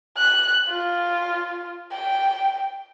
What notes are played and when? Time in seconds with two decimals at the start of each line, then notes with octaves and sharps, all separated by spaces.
0.17 F#6
0.70 F4
1.92 G5